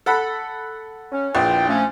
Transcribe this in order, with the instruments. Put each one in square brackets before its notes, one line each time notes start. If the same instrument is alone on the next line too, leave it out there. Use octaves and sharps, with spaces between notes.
[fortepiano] A4 F#5 B5
[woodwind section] C#4
[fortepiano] A#1 [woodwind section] E2 F4 G5
[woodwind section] F3 A3 C#4